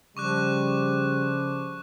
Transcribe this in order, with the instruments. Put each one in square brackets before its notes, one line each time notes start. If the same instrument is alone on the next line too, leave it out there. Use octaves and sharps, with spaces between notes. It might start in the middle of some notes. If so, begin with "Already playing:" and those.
[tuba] C#3 [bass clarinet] F3 [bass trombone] G3 [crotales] C#6 D6 F#6